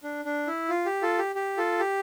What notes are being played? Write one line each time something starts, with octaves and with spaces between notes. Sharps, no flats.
D4
D4
E4
F4
G4
F4 A4
G4
G4
F4 A4
G4